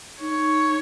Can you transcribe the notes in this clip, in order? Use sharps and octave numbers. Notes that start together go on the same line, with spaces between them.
D#4 C#5